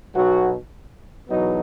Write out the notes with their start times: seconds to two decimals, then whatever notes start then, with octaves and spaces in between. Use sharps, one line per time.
0.15 B1 B2 F#3 F#4
1.29 E2 B2 F#3 B3 D#4